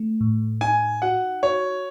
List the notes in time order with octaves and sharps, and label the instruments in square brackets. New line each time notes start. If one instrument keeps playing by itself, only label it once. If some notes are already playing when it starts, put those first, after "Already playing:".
Already playing: [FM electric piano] A3
A2
[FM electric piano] D#4 [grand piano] G#5
[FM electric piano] F#4 [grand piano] F#5
[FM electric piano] F#4 [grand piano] C#5